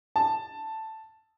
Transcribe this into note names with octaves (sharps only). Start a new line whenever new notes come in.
A5